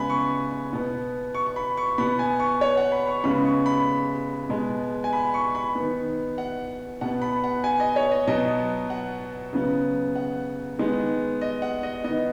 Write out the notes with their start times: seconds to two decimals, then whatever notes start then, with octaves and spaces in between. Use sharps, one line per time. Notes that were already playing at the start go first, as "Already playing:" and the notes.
Already playing: C#3 G#3 B3 G#5 B5
0.10 C#6
0.73 B2 B3
1.34 C#6
1.47 C#6
1.56 B5
1.77 C#6
1.98 B2 B3 B5
2.19 G#5
2.40 C#6
2.61 C#5
2.77 F#5
2.92 B5
3.07 C#6
3.24 C#3 G#3 B3 B5
3.45 C#6
3.66 B5
4.49 B2 G#3 B3
5.04 G#5
5.13 B5
5.34 C#6
5.55 B5
5.75 D#3 B3
6.38 F#5
7.01 B2 B3 F#5
7.22 B5
7.44 F#5
7.64 G#5
7.80 D#5
7.96 C#5
8.12 D#5
8.27 B2 F#3 B3 D#5
8.90 F#5
9.53 C#3 F#3 B3
10.16 F#5
10.79 D#3 G#3 B3
11.41 D#5
11.62 F#5
11.83 D#5
12.04 B3 D#5
12.08 D#3